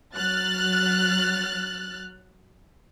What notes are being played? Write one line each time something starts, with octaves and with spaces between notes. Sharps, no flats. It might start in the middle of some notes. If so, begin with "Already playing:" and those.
F#3 F6 F#6 A6